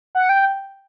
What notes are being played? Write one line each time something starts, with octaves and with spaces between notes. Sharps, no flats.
F#5
G5